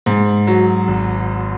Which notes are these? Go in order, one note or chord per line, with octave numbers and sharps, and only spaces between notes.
G#2
F#3
G#1